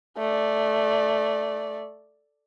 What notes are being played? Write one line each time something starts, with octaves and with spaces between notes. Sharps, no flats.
A3 D5